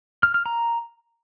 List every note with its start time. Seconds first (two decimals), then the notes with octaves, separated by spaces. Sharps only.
0.23 F6
0.34 F6
0.46 A#5